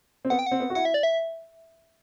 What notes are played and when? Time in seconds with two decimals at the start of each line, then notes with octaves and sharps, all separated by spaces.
0.25 C4
0.30 B3 F#5
0.39 G5
0.46 C4 F#5
0.60 B3
0.70 F#4
0.75 E4 F#5
0.85 E5
0.94 D5
1.03 E5